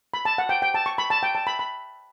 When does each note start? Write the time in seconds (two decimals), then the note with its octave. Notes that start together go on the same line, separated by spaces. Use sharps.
0.14 B5
0.25 A5
0.38 F#5
0.49 G5
0.62 G5
0.74 A5
0.86 C#6
0.98 B5
1.10 A5
1.23 G5
1.35 A5
1.47 B5
1.59 B5